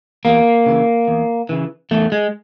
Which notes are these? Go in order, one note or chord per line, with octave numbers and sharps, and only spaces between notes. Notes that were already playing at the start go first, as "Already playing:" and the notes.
E2 A#3
C#3 E3
E2
C#3 E3
E2 A3
G#3